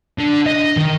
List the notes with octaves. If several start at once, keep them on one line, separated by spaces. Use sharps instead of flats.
D3
D#5
D#3